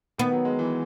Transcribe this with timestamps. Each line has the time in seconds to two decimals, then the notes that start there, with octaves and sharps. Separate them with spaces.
0.18 D#3 B3
0.32 F#3
0.45 G#3
0.59 E3